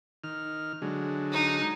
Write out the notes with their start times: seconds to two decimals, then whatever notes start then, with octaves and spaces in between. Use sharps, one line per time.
0.24 D#3 F6
0.82 D3 F#3 G#3
1.32 D#4